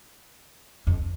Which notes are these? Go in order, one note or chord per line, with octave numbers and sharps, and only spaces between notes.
F2